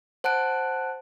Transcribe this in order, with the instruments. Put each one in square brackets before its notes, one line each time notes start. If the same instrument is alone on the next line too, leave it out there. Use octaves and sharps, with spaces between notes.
[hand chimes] C5 F#5 A5 F#6 D7